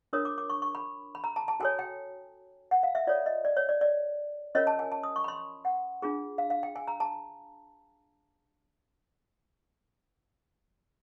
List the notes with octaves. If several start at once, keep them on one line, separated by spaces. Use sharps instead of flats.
D4 F4 A#4 C#5 D#6
D6
D6
C#6
C#6
B5
B5
A#5
A5
A5
F#4 A4 C#5 G#5
G5
F#5
F5
E5
F4 A4 C#5 D5
D#5
D5
C#5
D5
D5
C#4 F4 A#4 C#5 D#5
A5
G#5
A5
D#6
C#6
B5
C6
F#5
D4 F4 G#4
F5
F5
G5
G#5
A#5
A5